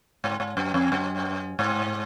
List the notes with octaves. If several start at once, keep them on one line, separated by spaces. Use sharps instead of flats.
G#2
G#2
F#2
F2
F#2
G#2